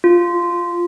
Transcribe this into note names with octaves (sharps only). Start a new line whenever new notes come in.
F4